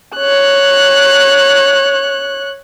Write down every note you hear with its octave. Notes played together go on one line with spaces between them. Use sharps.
C#5 F#6